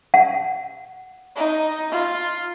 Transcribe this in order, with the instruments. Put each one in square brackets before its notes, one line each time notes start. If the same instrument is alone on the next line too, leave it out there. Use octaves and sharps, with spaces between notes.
[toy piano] F#5
[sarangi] D#4
F4